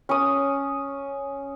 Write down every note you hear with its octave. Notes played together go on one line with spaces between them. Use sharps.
C#4 D#6